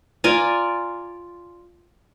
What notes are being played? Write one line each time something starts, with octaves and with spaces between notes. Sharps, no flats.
F4 D5 G#5 A#5